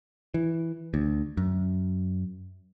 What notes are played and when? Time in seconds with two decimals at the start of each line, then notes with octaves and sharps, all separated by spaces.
0.34 E3
0.94 D2
1.37 F#2